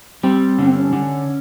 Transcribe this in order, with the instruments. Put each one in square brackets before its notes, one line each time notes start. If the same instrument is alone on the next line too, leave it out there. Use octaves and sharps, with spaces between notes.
[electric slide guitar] G3 [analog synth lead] C4
[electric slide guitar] D3 [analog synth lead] C#4
[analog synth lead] C4
C#4
[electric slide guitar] D3